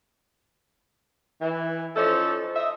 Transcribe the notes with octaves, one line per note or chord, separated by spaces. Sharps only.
E3
F3 C#4 D#4 A4
D#5 E5